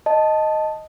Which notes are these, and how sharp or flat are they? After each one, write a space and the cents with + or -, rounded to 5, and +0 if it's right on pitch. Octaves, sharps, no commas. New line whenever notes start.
D#5 +0 A5 +0